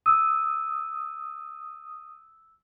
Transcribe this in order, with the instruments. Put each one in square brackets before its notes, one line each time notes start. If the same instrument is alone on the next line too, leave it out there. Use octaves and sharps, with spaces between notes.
[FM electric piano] D#6 [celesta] E6